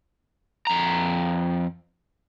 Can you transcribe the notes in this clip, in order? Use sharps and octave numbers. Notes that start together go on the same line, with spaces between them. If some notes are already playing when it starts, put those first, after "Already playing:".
F2 A#5